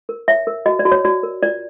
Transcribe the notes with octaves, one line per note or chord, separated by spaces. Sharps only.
A#4
C#5 E5
A#4
F#4 D#5
D5
F#4
C#5
F#4 D5
A#4
F4 D5